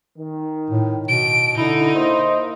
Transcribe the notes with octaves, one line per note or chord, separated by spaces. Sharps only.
D#3
A2
B2 D7
D3 D#4 E4
A#3 C5 D#5